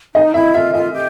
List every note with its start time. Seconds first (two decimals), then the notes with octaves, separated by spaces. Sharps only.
0.15 D#4 D#5
0.34 E4 E5
0.54 F4 E5
0.74 F4 D#5
0.93 G4